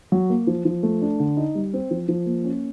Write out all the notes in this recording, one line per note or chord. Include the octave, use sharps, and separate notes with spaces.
F#3
A#3
F3
F3
A3
D4
D3
D#4
G3
C4
F3
F3
A#3
C#4